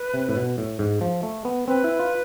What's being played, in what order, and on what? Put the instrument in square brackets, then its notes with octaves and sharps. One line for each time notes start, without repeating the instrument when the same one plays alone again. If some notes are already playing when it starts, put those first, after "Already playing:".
Already playing: [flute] B4
[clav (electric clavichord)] C3
A2
B2
A2
G#2
F3
A3
B3
[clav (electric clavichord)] C4 [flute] B4
[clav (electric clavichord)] E4
F4